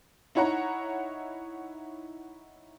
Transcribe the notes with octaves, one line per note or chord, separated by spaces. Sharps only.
D#4 E4 C#5 F#5 A#5